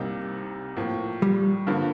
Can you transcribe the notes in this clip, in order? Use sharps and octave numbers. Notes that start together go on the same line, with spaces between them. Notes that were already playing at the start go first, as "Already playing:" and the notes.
Already playing: C2 C3 G3 A#3 D#4
A2 F3 A#3
G3
G2 D3 F3 A#3